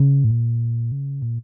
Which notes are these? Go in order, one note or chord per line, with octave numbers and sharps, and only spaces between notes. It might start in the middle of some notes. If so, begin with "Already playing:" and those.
Already playing: C#3
A2
A#2
C#3
A#2